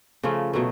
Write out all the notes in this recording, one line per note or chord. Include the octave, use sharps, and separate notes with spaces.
C#3 F3 A3
B2 F#3 A3